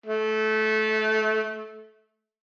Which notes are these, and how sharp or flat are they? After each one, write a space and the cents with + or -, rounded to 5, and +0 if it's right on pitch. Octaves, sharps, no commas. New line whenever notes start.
A3 -20